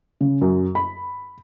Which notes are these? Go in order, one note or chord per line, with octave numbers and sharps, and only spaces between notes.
C#3
F#2
B5